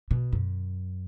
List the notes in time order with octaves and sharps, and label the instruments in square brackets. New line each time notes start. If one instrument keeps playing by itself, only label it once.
[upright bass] B2
F#2